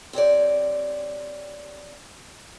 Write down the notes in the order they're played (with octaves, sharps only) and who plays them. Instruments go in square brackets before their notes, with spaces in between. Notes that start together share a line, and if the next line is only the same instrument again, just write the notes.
[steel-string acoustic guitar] C4 G4 C#5 D5